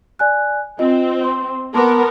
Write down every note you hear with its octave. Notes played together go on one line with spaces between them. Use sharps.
D5 G#5 F#6
C4 F4 D#5
C6
B3 A#4 A5 C6 D6